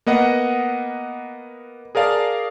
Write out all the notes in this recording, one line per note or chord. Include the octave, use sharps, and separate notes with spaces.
A#3 B3 D#5 F#5
G#4 A#4 D5 F5 A5